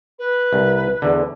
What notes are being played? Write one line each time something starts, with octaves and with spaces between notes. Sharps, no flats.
B4
C2
E2 D3